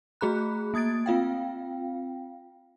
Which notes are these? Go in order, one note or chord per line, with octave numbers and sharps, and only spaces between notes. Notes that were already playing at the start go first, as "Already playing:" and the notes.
A3 F#4 G#4 A#5 B5 F#6
A#3 D#6 G#6 A6 D7
C4 F4 F5 G5